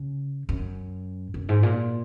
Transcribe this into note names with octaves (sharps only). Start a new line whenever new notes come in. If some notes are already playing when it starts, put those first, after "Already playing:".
Already playing: C#3
F#2
F#2
G#2
A#2